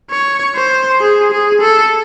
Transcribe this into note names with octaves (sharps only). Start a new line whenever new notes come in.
C#5
C5
G#4
G#4
A4